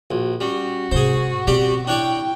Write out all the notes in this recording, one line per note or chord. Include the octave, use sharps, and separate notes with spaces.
A#1 F#4
G3 C#4 F#4
G#2 C3 G#4 C5
B2 G3 C4 G4 D5
D4 E4 C#5 D5 G5